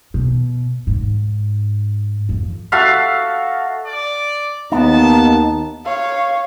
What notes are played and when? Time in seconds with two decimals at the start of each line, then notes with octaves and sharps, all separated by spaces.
0.14 B2
0.87 G#2
2.29 F2
2.72 F#4 A4 E5 F5
3.86 D5
4.72 D#2 B3 D#4 A5
5.85 C#5 F5